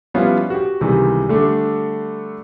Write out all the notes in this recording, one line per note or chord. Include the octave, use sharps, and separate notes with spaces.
F3 G3 B3 C#4 E4 F4
F#4 G4
C#2 C3 D#3 E3 G3
D3 G3 A3 D4